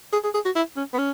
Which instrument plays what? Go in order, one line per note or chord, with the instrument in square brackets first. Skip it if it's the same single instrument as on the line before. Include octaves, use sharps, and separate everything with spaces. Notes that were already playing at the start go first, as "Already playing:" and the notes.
[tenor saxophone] G#4
G#4
G#4
F#4
E4
C#4
B3
C#4